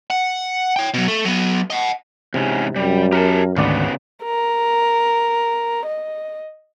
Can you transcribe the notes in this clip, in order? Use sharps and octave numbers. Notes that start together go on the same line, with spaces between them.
F#5
C#5 G5
B2 F#3
A3
F#3 B3
D#5 F#5
E2 G#2 C3 C#4
F#2 G3
G4 A#4 F#5 A5
G#1 D2 C#3 B3 D5
A#4
D#5